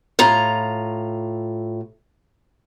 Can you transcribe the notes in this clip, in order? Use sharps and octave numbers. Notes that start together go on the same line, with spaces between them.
A2 F4 A#5